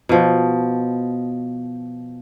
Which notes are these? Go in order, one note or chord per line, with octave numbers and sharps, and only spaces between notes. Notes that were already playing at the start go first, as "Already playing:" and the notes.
B2 F3